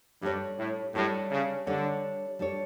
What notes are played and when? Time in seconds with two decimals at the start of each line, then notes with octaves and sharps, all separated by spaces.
0.22 G2 G3 D4 A4 C#5
0.59 A2
0.94 A2 G3 D4 A4 C#5
1.31 C#3
1.67 D3 G3 D4 A4 C#5
2.39 G3 D4 A4 C#5